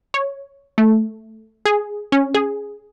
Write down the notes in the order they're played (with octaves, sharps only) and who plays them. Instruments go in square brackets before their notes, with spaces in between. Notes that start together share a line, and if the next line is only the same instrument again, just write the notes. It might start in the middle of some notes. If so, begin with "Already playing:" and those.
[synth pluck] C#5
A3
G#4
C#4
G#4